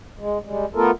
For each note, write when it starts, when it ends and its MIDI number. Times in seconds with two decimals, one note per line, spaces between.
0.19 0.38 56
0.45 0.65 55
0.45 0.65 56
0.75 0.91 57
0.75 0.91 59
0.75 0.91 65
0.75 0.91 69
0.75 0.91 70